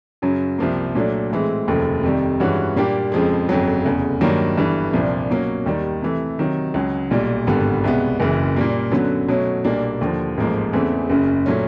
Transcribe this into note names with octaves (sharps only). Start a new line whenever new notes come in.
F#2 C#3 F#3
C2 C3 F3 A#3
A#2 F#3 A3 D4
A2 E3 G#3 C4
F1 D#2 C#3 F3 A3
F2 C3 D#3 G3
G2 E3 G#3 C#4 F#4
A#2 G3 A#3 D4 G4
F2 C#3 F3 G#3
G1 F2 C#3 F#3
F1 E2 C#3
G2 D#3 F#3 A#3 D4
G1 G2 E3
C2 A#2 F3 A#3 D4
B2 F#3 A#3 C#4
D#2 D#3 G3
C3 E3 A3
C3 D#3 F#3
C#2 C#3 F#3
B1 A#2 G3
G#1 G2 D3 G3 B3
C2 B2 G#3 B3
F#1 F#2 C#3 E3
A#2 G3 A#3
F#2 D3 F#3 B3
B2 F#3 A3 C#4
B1 A#2 G3 A#3 D4
D#2 D3 F3
A1 G#2 F3 A#3
E2 C#3 E3 A3 C4
F#1 F#2 C#3
A#2 F#3 A3 C#4